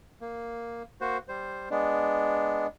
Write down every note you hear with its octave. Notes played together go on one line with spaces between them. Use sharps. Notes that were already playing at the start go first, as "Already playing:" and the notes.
A#3
A#3 F#4 C5
G3 C5
G#3 B3 D4